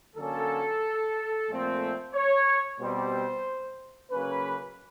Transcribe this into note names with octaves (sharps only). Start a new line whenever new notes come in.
D3 F#3 A#3 C#4 A4
A#2 F3 A3 C4
C#5
B2 G3 C4 C5
C#3 F#3 A#3 C#4 B4